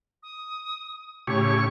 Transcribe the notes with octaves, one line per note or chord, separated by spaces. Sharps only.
D#6
A2 C#3 G4 C#5 C#6